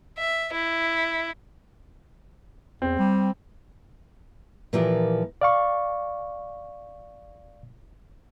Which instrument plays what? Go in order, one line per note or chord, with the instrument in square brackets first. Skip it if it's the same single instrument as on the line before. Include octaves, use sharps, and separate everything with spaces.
[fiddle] E5
E4
[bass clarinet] E2 [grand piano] C4
[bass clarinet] G3
[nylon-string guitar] A#2 E3 F3 F4 G4 A#4
[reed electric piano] D5 F5 C#6